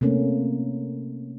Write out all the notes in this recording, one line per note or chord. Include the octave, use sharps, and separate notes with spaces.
C3 A3 A#3 C#4